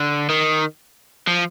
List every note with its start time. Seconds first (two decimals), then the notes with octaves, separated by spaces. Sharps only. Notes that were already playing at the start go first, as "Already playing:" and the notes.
Already playing: D3
0.29 D#3
1.28 F3